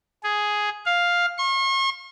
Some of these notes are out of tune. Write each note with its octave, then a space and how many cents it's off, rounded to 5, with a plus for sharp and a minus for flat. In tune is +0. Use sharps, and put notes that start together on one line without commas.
G#4 +5
F5 +5
C#6 -45